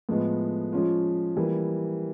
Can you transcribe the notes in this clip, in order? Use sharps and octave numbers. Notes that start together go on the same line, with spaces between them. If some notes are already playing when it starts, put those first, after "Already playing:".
A2 F3 G#3 B3
F3 G#3 C#4 F4
E3 G3 A#3